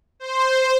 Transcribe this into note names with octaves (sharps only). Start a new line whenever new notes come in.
C5